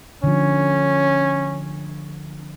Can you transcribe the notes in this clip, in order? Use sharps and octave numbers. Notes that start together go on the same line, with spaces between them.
D3 F3 C#4